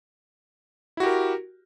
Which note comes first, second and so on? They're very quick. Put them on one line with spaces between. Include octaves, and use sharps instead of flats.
E4 F#4 G4 A#4